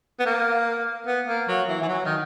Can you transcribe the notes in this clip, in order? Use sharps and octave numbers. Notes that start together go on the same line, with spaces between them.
B3
A#3
B3
A#3
F#3
E3
E3
F#3
D#3